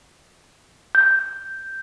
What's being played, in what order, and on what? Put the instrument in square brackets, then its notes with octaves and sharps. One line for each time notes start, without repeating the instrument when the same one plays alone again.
[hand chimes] G6